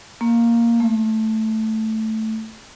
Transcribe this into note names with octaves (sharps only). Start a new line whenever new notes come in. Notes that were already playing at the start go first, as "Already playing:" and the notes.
A#3
A3